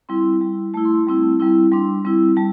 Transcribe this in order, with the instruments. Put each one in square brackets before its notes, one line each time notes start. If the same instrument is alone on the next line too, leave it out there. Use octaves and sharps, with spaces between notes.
[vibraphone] G3 C4 E4 C6
G3 E4
A3 E4 A5
C6
A5
G3 C4 E4
G3 C4 E4
G3 D4 C6
G3 C4 E4
G3 A5